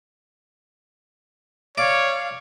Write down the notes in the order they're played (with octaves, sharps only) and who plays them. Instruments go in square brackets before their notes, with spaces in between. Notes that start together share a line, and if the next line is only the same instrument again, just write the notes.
[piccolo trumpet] C#5 [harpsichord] D5 [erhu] F5